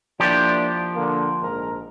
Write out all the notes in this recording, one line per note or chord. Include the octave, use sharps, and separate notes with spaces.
F3 A#3 D4 E4 G4
D3 A#3
A#1 G#2 A#4